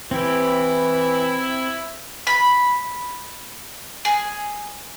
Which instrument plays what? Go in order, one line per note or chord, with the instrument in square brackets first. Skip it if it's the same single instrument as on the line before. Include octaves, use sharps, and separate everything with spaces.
[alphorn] E3 [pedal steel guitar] C4 G4 [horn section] E4
[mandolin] B5
G#4